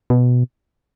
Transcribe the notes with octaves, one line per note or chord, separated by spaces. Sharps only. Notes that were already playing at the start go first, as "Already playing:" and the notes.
B2